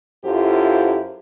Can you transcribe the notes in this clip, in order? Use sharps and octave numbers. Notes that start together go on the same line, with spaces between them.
F#2 E4 F4 G4 A4 C5